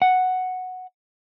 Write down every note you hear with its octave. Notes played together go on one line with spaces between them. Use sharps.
F#5